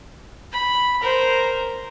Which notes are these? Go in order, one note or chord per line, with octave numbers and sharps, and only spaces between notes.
B5
A#4 C5